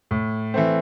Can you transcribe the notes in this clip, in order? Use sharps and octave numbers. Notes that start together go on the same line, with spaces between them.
A2
E3 A3 C4